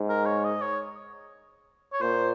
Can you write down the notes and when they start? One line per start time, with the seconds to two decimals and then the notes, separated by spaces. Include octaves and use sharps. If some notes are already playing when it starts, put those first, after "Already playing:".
Already playing: G#2
0.10 A#4
0.26 C#5
0.45 D#5
0.62 C#5
1.93 C#5
2.02 A#2 C5